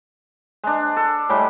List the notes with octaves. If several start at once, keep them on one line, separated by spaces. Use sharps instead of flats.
G#3 D4
A4
A2 G3 G#3